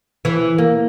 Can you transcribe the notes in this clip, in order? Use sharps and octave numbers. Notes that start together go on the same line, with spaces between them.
E3
A#3